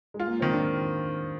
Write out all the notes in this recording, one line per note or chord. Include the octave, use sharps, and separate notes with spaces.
G#3
F4
A#3
D#3 C4
D4